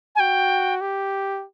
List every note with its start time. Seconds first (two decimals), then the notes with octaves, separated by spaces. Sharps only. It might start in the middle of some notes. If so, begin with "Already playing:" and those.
0.15 G#5
0.19 F#4 G5
0.81 G4